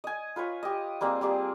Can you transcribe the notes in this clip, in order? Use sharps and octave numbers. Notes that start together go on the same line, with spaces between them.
D#5 G#5
F4 B4 C#5 G#5
G4 D#5
G3 A#3 C4 G#4
G3 A#3 G4 G#4